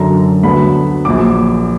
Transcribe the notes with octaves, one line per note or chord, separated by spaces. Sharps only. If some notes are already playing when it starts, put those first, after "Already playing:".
Already playing: F#2 D3 F#3 A#5
D2 D3 F#3 B3 B5
A#1 A#2 F#3 D6